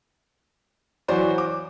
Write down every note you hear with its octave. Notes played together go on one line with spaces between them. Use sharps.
E3 F#3 F#4 C5 D5
D6